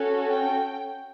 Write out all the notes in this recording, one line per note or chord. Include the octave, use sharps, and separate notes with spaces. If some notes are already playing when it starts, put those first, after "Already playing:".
Already playing: C#4 F#4 A4
G5